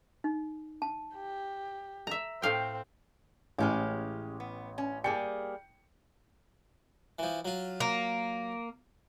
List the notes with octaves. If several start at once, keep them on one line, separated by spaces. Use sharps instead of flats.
D#4
A5
G4
E5 A#5
A2 C4 F5 G5
A1 G#3 C#4 G4 F6
B3
C#4
G3 A#3 G#4 G5 C#7
E3 F3
F#3 F4
A#3